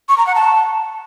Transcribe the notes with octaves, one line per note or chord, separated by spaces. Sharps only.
C#6
A#5
F#5
A5